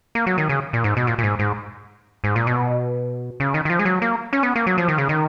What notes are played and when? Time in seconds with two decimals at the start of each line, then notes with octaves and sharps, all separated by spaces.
0.15 A#3
0.27 F#3
0.38 D#3
0.49 C#3
0.73 A#2
0.84 G#2
0.97 B2
1.07 A#2
1.18 A#2
1.23 G#2
1.39 G#2
2.24 G#2
2.36 A#2
2.47 B2
3.40 C#3
3.54 D#3
3.65 D#3
3.70 F3
3.79 G#3
3.85 F#3
4.02 A#3
4.33 C#4
4.43 B3
4.56 A#3
4.67 F#3
4.78 F3
4.88 D#3
4.98 C#3
5.09 D#3